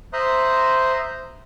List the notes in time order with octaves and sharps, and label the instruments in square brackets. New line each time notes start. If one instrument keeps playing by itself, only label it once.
[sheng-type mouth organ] C5 E5 A#5 C6 D#6 F#6